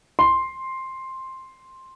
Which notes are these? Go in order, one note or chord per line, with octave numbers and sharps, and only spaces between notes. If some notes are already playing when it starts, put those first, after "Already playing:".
C6